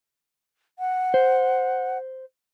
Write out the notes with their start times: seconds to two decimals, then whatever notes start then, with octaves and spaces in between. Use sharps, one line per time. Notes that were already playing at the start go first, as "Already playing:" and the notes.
0.79 F#5
1.14 C5